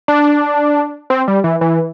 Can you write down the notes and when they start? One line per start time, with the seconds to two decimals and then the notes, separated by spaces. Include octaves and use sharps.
0.08 D4
1.10 C4
1.28 G3
1.44 E3
1.61 E3